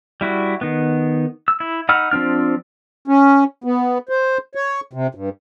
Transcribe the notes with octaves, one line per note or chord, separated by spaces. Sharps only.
G3 E4 F#4
D#3 B3
E6
E4
D#4 F#5 B5 E6 F6
F3 C4 D4 F6
C#4
B3
C5
C#5
C3
G2